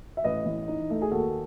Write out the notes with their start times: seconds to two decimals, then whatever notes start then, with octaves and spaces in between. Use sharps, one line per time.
0.17 E5
0.24 A1 B4 D#5
0.46 E3
0.68 D#4
0.90 A3
1.02 G#4
1.11 D#2 F#4 A4